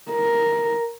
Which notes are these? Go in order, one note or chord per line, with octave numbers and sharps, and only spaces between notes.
A#4